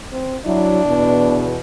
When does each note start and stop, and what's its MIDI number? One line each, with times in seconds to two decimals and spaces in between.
0.12 0.37 60
0.45 0.80 54
0.45 1.47 62
0.45 0.80 64
0.86 1.58 40
0.86 1.58 47